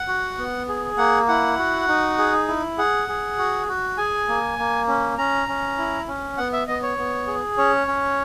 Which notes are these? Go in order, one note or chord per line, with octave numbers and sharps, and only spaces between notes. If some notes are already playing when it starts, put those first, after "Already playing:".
Already playing: F#5
F#4
B3
G#4
A#3 F#5
E4 F#5
F#4
D#4
G#4
E4
G#4 F#5
G#4
F#4
F#4
G#4 G#5
A#3
A#3
C#4
C#4 A#5
C#4
E4
C#4
B3 F#5
E5
B3 D#5
C#5
B3
G#4
C#4 C#5
C#4